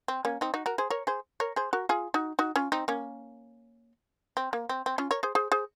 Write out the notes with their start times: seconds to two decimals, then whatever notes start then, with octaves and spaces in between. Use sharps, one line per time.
0.08 C4
0.25 A#3 C#4
0.41 C4 D#4
0.54 D#4 F#4
0.66 F#4 A#4
0.78 G#4 C5
0.90 A#4 C#5
1.07 G#4 C5
1.40 A#4 C#5
1.56 G#4 C5
1.73 F#4 A#4
1.89 F4 G#4
2.14 D#4 F#4
2.39 D#4 F#4
2.56 C#4 F4
2.72 C4 D#4
2.88 A#3 C#4
4.37 C4
4.53 A#3
4.69 C4
4.86 C4
4.98 C#4 F4
5.11 A#4 C#5
5.23 G#4 C5
5.35 G#4 C5
5.52 G#4 C5